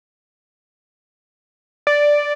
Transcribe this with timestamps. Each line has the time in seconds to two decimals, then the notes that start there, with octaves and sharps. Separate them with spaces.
1.87 D5